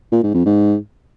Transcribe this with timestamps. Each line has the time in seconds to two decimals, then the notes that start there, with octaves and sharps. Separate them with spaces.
0.12 A#2
0.23 G#2
0.34 F2
0.46 G#2